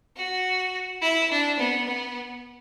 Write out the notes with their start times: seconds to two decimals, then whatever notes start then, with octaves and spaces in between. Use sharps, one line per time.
0.16 F#4
1.01 E4
1.31 D4
1.59 B3
1.87 B3